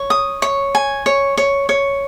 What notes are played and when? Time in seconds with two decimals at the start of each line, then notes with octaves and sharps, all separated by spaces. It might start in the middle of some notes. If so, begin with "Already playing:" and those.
Already playing: C#5
0.10 D#6
0.42 C#5
0.75 G#5
1.06 C#5
1.37 C#5
1.69 C#5